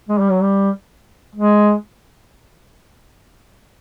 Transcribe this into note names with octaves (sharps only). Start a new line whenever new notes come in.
G#3
G3
F#3
G3
G#3